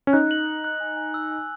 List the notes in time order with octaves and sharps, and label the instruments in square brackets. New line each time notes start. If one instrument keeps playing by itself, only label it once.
[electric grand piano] C#4
[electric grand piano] D#4 [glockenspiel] F#6
[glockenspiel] F#7
F#6
F#6
G#5
G#5
E6
G#5